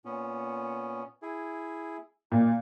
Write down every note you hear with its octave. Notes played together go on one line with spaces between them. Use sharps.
A#2 B3 C#4
E4 G#4
A#2 D#4